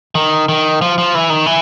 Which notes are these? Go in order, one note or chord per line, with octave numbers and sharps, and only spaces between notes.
D#3
D#3
F3
F3
E3
D#3
E3